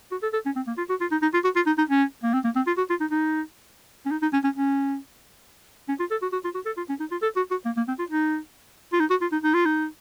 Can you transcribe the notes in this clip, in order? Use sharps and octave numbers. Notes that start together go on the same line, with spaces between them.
F#4
A4
A4
C#4
C4
A#3
F4
F#4
F4
D#4
D#4
F4
F#4
F4
D#4
D#4
C#4
A#3
C4
A#3
C4
F4
F#4
F4
D#4
D#4
C#4
D#4
D#4
C#4
C#4
C#4
C#4
F4
A4
F#4
F#4
F4
F#4
A4
F4
C#4
D#4
F4
A4
F#4
F#4
A#3
A#3
C4
F4
D#4
F4
D#4
F#4
F4
D#4
D#4
F4
D#4